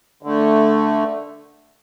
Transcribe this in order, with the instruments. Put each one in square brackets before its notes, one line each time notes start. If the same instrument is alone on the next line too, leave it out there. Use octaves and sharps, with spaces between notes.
[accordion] D3 A3